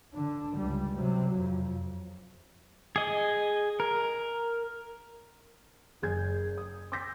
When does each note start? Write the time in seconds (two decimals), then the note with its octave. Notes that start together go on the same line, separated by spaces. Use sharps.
0.14 D3 D4
0.57 C#2 G3
0.96 C3 F#3
1.39 F2
2.96 G#4 D#5
3.80 A#4
6.02 F#1 G#4 G6 G#6
6.58 D#6
6.92 C6 D6 E6 G6 A#6 B6